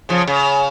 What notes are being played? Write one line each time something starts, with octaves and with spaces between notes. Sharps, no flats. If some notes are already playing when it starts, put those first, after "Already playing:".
C#3 F3
C#3